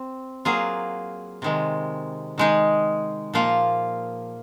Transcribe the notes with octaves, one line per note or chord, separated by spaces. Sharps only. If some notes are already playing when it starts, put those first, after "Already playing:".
Already playing: C4
F#3 A#3 F4 G#4
C3 D#3 G#3
D#3 G#3 D#4 G#4
A#2 F3 A#3 F4